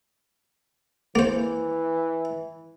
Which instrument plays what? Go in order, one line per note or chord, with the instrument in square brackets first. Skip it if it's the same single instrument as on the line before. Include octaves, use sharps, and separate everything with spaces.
[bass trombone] E3 [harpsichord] A#3 C5